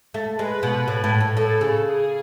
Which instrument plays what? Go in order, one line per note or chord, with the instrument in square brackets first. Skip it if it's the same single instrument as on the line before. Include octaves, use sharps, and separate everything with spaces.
[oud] A3
[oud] G#3 [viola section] B4
[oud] B2
A2
A2
A2
[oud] A2 [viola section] A4
[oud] C#3
[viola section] G#4